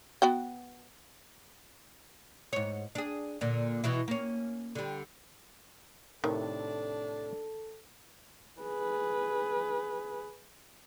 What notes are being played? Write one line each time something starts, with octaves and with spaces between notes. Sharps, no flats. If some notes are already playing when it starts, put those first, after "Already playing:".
B3 F#4 G5
G#2 C#5
D4 G#4
A#2 D3
B2 E3 E4
A#3 C#4
D3 G3
A2 C3 D#3 D4 A4 F#5
G#4 B4